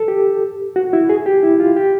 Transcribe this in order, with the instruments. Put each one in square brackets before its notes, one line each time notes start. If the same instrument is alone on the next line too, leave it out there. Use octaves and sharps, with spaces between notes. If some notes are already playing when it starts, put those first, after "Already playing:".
Already playing: [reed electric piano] A4
G4
F#4
E4
G#4
G4
E4
F4
G4